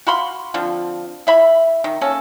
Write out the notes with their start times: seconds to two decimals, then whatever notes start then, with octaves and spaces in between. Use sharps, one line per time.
0.07 F#4 F5 B5 C6
0.54 D3 F3 C4
1.27 E4 E5 B5
1.84 D#3
2.01 A#3 C#4 A4